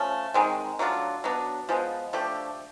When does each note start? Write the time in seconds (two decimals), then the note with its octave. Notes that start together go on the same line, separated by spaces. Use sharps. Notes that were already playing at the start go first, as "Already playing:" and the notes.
Already playing: F3 A3 C#4
0.34 D#3 G#3 C4
0.79 F#3 A3 D4 F4
1.24 F#3 B3 D4
1.69 F3 G#3 B3
2.13 F3 A3 D4 G4